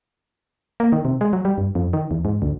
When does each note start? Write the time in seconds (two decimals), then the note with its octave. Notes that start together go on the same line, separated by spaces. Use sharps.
0.80 A#3
0.92 D#3
1.05 C3
1.21 G#3
1.33 F#3
1.45 G3
1.58 G2
1.75 F2
1.93 D#3
2.11 E2
2.25 G#2
2.42 D2